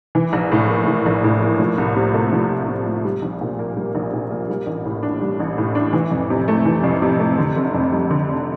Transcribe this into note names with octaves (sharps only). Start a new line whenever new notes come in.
E3
A#1
A2
A#3
E3
A#1
A2
A#3
F3
C2
C3
A3
F3
C2
C3
A3
G3
A#1
A#2
A#3
G3
A#1
A#2
A#3
G3
A1
A2
D4
G3
A1
A2
D4
E3
F2
C3
A3
E3
F2
C3
A3
D3
F1
F2
G3
D3
F1